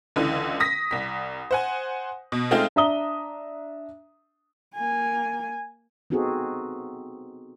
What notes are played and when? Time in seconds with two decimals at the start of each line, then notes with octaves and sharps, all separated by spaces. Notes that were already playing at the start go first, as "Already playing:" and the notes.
0.16 C#2 D3 E3
0.60 D#6 A#6 B6
0.91 C2 B6
1.51 C5 F#5 G#5
2.32 B2
2.51 G#3 A3 C4 D#4 F4 G#4
2.76 D4 E5 A#5 D#6 G7
4.74 A#3 G#5
6.10 B3 C4 D#4 F#4 G#4 A4